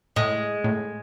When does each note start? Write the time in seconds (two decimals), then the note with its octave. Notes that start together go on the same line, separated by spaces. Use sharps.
0.16 A2 G#3
0.64 A2